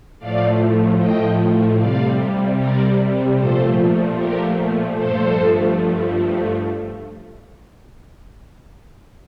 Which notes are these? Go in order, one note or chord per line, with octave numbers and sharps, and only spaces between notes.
A2 F3 A3 D5 F5
D#5 G5
C3 G3 D5 F5
A#4 D5
A#2 F3 A3 A4 C5
G4 A#4
G2 F3 A3 A4 C5